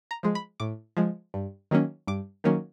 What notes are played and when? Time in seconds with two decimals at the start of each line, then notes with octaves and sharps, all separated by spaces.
0.11 A#5
0.23 F3 G#3
0.35 B5
0.60 A2 D6
0.97 F3 G#3
1.34 G2
1.71 D#3 F#3 A#3 C#4
2.07 G2 D6
2.44 D#3 F#3 A#3 C#4